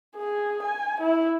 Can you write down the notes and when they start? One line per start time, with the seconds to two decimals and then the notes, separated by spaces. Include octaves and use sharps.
0.16 G#4
0.63 G#5
1.00 E4